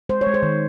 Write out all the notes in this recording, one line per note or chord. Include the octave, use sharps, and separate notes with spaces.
G#3 C5
C#5
G#3
C5
D#3